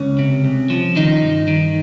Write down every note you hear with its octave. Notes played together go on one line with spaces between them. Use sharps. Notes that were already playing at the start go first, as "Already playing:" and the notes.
Already playing: C#2 C#4
C3
C2
F3
D#3 D#4
G2
D#3